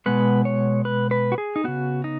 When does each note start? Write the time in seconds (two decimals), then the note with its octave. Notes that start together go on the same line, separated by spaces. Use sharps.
0.06 B2 G#3 B3 B4
0.45 C#5
0.85 B4
1.11 B4
1.32 F#4
1.38 G#4
1.56 D#4
1.64 C#3 B3 F#4
2.04 D#4